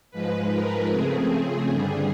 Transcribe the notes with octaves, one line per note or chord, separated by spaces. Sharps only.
G#2 F3 G#3 B4
A#4
C#3 F3 A3 C4 G#4
G2 D3 G3